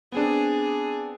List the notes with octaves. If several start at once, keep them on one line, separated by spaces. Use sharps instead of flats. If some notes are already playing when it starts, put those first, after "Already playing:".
B3 C4 D4 G#4